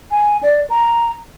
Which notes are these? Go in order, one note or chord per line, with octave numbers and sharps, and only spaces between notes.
G#5
D5
A#5